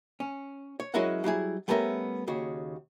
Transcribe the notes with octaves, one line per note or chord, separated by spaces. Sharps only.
C#4
C#5
F#3 G#3 C#4 E4 A#4 F#5
F#3 G3 E4 G#4
G3 A3 B3 C#4 A#4 E5
D#2 C#3 F#4